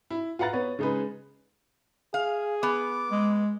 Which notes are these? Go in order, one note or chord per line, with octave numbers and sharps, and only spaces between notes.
E4
F4 B4 F#5 A#5 A6
B3 B4 C#5
C#3 G#3 D#4 G#4 B4
G#4 F5
B3 D6
G#3